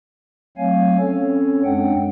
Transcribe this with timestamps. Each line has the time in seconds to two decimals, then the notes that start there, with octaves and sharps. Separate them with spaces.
0.57 F#3 A3 C4 C#5 F5 G#5
0.99 C4 C#4 A4 C#5
1.64 F#2 G#3 C4 D4 F#5 G5